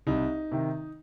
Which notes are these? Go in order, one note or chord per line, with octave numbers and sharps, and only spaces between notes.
C2 D#4
C3 D#3